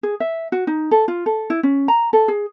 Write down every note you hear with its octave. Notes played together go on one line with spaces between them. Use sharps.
G#4
E5
F#4
D#4
A4
F4
A4
E4
C#4
A#5
A4
G#4